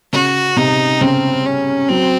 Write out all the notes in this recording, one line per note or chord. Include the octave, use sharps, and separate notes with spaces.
C#3 F#4
C3 D#4
C#3 C4
C#4
F#3 C4